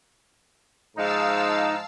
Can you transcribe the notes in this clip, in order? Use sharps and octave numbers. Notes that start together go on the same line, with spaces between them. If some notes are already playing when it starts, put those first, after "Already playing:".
G#2 F3 G#3 D#4 F5 A5 E6